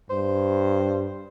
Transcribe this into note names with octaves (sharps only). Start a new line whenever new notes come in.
G2 C5